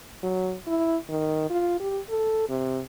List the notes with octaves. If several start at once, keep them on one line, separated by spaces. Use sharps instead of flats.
F#3
E4
D#3
F4
G4
A4
C3